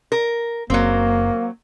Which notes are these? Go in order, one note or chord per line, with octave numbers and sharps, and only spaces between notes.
A#4
F#1 F#3 A#3 C4